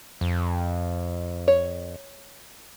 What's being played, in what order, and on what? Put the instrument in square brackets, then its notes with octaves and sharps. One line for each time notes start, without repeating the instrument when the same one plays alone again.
[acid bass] F2
[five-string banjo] C#5